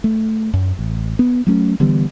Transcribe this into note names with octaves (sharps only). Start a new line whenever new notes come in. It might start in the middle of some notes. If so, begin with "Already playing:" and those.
A3
F#2
A1
B3
F#3 A3 C#4
D3 E3 G3 B3